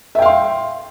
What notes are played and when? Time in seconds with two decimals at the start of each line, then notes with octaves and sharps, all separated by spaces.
0.15 E5
0.19 G5
0.22 F5
0.26 C6